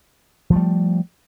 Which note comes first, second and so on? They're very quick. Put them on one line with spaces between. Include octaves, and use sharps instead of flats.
F3 A3 G3